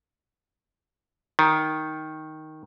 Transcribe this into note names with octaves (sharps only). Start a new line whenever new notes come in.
D#3